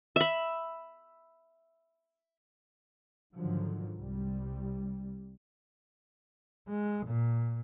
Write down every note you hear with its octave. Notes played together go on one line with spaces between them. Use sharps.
E5 B5
G#2 D3 D#3 F3 F#3
C2 G3
G#3
A#2